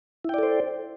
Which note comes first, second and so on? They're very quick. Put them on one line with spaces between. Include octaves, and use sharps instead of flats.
E4 G5 D5 A4 C5